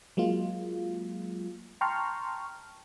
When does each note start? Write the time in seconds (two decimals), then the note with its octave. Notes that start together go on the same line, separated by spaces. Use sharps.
0.17 F#3 G#3 A#3 F4
1.81 G5 A5 A#5 C6 C#6 F6